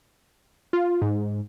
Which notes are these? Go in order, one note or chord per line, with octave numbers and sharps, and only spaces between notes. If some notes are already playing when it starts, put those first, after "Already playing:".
F4
G#2